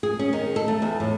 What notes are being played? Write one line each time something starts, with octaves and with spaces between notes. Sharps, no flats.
G#4
C#4
D#3
A4
A3
E2
A2